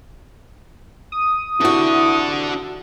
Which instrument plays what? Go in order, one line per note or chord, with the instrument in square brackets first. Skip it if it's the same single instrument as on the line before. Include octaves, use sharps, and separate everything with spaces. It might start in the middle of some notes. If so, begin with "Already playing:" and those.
[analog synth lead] D#6
[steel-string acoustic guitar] C3 F#4 [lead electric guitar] D4 A4 [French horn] E4